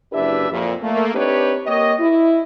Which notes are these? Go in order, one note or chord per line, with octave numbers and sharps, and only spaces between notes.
F#1 D4 E4 G4 B4 E5
F2 A#2
A3 A#3
C4 D4 D#4 G4 B4 C#5
A#3 G4 C#5 D#5
E4